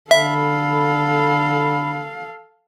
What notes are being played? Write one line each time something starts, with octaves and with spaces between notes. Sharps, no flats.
D3 A4 E5 F5 B5